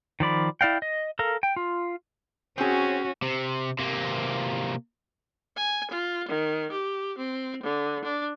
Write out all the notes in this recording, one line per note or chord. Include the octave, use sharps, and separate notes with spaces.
D#3 F3 D5 B5
E4 D5 F5 G5
D#5
A4 A#4 F5
G5
F4
C4 C#4 F#4 G#4
C3
C3 A#3
G#5
F4
D#3
G4
C4
D3
D4